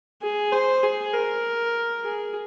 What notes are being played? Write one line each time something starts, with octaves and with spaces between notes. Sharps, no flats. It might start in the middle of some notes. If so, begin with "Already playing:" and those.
G#4
C5
G#4
A#4
G#4